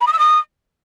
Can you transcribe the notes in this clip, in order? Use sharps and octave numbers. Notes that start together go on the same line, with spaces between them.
B5
D#6
E6
D#6